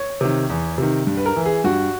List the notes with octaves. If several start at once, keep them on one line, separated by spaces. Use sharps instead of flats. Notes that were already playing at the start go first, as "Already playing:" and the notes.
Already playing: C#5
C3 D#3
E2
C3 D#3
G2
B4
A#4
E3
G#4
G2 F#4